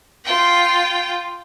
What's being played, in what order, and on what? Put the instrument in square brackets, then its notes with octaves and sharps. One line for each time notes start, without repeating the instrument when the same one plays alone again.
[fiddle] F4 G5